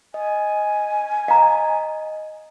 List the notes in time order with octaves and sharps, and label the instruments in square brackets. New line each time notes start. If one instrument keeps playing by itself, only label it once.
[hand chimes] D#5 [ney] G#5
[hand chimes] D#5 [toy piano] F5 A#5